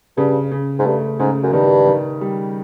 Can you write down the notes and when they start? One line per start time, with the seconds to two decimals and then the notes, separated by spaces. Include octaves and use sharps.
0.17 G2 C#3
0.51 C#3
0.79 G#2
0.85 G2 A3
1.20 G#2 C#3
1.43 F#2
1.53 G2 D#3
1.87 D#3
2.21 G3